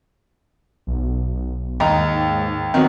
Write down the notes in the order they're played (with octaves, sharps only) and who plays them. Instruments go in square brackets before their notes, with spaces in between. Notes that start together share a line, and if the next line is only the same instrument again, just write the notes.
[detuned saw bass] B1
[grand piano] D#2 D#4 A#5 [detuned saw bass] G#2
[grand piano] D#3 F#3 B3 [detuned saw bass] C4